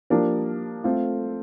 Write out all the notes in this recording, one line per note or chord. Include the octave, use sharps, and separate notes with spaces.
F3 A#3 D4 G4 A#4
A3 C4 F4 A4